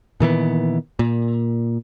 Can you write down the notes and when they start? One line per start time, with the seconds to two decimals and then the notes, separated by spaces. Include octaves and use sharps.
0.20 A#2 D#3 E3 B3
0.99 A#2